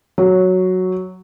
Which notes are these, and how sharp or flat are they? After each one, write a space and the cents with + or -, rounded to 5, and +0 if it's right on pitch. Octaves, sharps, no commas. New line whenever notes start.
F#3 +0